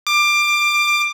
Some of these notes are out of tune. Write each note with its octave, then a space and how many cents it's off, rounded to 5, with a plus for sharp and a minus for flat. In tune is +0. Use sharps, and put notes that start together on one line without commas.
D6 +20